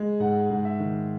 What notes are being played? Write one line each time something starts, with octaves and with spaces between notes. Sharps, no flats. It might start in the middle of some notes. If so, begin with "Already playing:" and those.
Already playing: G#3
G#2 F#5
G#2
E5
D#3